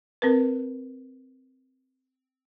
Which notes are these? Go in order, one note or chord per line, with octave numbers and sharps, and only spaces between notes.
C4 A#4 B4